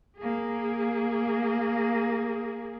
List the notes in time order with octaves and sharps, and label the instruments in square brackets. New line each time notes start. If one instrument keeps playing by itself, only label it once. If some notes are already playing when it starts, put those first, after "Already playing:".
[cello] A#3 G#4